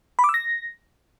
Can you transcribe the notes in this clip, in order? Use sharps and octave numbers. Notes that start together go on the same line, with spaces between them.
B5
D6
E6
A#6